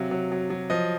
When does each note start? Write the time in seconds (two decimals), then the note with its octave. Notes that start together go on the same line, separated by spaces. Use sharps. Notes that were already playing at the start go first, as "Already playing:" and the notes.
Already playing: C3 F#3 F5
0.11 F#3
0.32 F#3
0.50 F#3
0.70 F3 D#5